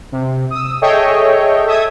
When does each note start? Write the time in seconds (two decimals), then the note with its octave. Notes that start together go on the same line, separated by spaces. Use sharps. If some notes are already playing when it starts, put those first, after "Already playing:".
0.12 C3
0.51 D#6 E6
0.81 G#4 A4 C#5 D#5 E5 G5
1.66 A4 E5 D#6 G#6